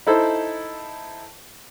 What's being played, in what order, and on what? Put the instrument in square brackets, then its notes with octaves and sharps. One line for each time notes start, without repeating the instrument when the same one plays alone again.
[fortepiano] D#4 E4 A4 C5